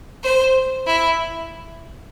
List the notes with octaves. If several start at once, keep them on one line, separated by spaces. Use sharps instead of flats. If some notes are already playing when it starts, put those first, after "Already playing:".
C5
E4